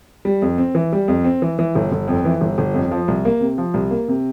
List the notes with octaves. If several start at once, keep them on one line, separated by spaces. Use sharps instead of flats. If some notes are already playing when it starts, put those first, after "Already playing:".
G3
F2
C4
E3
G3
F2
C4
E3
E3
G1
G1
F2
E3
G1
G1
F2
F3
C2
A#3
C3
F3
C2
A#3
C3